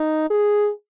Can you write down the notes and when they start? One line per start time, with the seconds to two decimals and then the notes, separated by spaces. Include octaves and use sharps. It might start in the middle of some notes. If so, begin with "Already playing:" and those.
Already playing: D#4
0.30 G#4